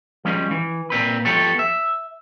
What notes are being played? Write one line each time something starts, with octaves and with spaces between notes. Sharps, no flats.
F3 G3 G#3 C#4
E3
A#2 C4 B4
F3 B3 G4 A4 C#5
E5